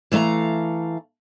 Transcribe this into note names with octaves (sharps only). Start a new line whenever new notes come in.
E3 A3 D5 F5 A#5